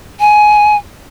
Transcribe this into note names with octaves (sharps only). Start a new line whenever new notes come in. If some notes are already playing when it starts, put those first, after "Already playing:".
G#5